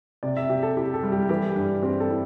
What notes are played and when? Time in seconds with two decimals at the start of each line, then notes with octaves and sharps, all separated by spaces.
0.23 C3 D5
0.37 E5
0.49 C3 G4
0.63 A4
0.76 E4 G4
0.94 A4
1.03 G3
1.12 G4
1.29 E3 G4
1.56 G2
1.83 C4 G4
2.00 A4
2.10 E4